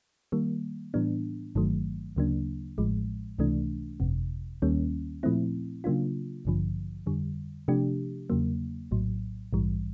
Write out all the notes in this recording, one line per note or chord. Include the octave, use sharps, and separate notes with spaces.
D#3 G3 A#3
A2 E3 G3 B3 D4
G1 G2 D#3 F#3 A3
D2 C#3 F#3 A#3 D4
A1 A2 F3 G#3
C#2 C3 E3 A3 D4
G1 F2 C3
D#2 D#3 G3 A#3 C#4
A#2 F3 A3 C4 E4
C#3 F#3 A#3 D4 F4
A1 G2 D3 F3
F2 D3 G3
C3 F3 A3 D4 G4
E2 C#3 F#3 A#3
A#1 A2 F#3
A#1 G#2 E3 G3